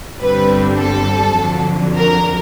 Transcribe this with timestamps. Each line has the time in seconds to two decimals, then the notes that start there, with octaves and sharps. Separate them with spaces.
0.20 G1 G2 D3 G3 C4 B4
0.78 A4
1.37 F2 D3 F#3
1.95 A#4